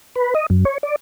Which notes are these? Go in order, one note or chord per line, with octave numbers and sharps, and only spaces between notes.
B4
D#5
F#2
C#5
D5